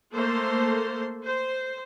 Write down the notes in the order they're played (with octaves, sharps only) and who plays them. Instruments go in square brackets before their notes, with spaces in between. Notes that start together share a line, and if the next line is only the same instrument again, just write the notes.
[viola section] A3 A#3 A4 C5 C6
C5